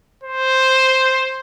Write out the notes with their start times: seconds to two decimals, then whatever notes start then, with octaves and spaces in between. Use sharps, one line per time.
0.23 C5